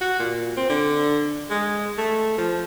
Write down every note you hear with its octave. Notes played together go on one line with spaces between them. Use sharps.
F#4
A#2
C4
D3
G#3
A3
F3